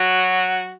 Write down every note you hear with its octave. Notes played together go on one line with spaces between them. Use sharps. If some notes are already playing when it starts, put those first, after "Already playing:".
Already playing: F#3 F#4